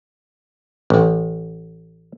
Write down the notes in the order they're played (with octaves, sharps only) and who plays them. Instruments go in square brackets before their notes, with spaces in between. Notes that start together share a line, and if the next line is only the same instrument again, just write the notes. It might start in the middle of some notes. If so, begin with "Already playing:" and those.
[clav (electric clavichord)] A1